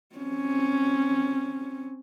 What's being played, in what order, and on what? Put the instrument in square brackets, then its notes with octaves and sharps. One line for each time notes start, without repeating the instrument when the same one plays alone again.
[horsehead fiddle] C4 C#4